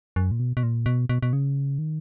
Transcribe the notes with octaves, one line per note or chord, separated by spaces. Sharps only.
F#2
A#2
B2
B2
A#2
B2
B2
B2
C#3
D#3